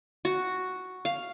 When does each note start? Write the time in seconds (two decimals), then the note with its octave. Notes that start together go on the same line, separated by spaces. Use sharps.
0.25 F#4
1.05 F5